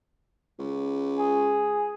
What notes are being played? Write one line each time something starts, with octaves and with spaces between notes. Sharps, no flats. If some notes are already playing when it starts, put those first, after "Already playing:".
C#2
G#4